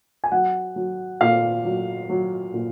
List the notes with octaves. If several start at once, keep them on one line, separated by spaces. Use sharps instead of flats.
G#5
F#3 F#5
F#3
A#2 F5
F#3
F#3
A#2